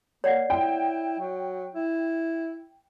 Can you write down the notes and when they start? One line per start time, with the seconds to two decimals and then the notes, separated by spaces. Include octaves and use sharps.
0.24 A#3 C#5 D5 F#5
0.50 E4 G5
1.19 F#3
1.75 E4